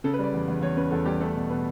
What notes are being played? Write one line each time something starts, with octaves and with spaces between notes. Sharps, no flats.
C#3 A4
B4
G3 D5
E2
E2
E2 C#5
C#3 B4
E2 A4
G3 G4
A3 A4
B2
B2 B4